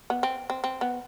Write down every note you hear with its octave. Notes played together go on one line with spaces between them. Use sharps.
B3
C4
C4
C4
B3